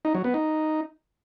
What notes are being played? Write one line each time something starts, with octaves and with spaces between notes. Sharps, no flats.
D#4
F#3
B3
D#4